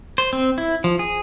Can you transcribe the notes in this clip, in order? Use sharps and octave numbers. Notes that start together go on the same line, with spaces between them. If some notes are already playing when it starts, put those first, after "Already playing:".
C5
C4
E4
F3
G#4